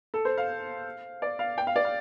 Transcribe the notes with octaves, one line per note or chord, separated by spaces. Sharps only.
A4
C5
F5
D5
F5
G5
F5
D5
F5